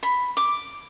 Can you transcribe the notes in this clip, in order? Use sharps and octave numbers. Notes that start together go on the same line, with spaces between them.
B5
D6